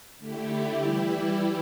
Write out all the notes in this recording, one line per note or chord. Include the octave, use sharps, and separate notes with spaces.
D3 A3 E4 G4
E3 G3 E4 G4